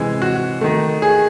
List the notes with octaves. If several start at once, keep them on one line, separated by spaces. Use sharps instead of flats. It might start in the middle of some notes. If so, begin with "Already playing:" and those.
Already playing: C3 E3 G#3
F#4
D#3 A3
G#4